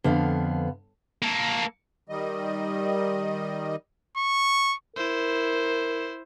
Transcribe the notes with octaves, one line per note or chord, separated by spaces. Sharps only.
F2 D3 B3 F5
A#3 A4
D#3 G3 D#5
C#6
E4 A#4 C5